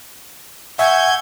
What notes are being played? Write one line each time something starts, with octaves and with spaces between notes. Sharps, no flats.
E5 F#5 G#5 C#6 E6 G6 G#6